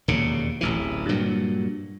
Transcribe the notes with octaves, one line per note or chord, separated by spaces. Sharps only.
E1 D#2 A#2 C#3
D1 A1 E3
G2 A#2 F#3